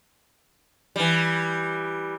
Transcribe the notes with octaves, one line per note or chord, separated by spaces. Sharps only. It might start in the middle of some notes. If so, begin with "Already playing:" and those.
E3 G3